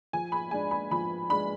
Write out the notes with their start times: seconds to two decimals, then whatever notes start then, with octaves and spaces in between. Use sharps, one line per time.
0.13 F3 G#5
0.32 B5
0.51 G#3 D4 G#5
0.71 B5
0.91 F3 B5
1.30 G#3 D4 B5